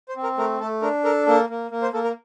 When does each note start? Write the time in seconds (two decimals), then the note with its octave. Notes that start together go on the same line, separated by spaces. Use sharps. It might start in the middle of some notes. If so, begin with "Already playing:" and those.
0.09 C5
0.16 C4
0.23 A#4
0.38 A3 A#4
0.60 A3 A4
0.82 D4 A#4
1.04 A4 A#4
1.27 A#3 A4
1.49 A#3
1.71 A#3
1.82 C5
1.93 A#3 A4
2.04 A#4